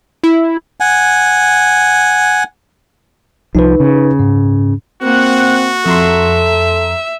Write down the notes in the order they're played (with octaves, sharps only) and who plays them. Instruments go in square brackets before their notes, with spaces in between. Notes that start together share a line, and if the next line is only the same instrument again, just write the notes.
[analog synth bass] E4
[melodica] F#5 G#5
[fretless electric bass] C2 F3 [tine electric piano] D#4 B4
[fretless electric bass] C#3
[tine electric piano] G#2
[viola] A#3 F#5 [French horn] C4 [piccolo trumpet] F#4
[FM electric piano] F2 A#5 C6 [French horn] A4 [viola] E5